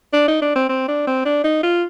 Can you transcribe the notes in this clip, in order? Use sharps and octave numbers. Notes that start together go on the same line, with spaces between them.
D4
D#4
D4
C4
C4
D4
C4
D4
D#4
F4